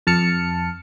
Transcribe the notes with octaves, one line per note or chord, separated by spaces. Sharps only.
F2 A5 F6 C#7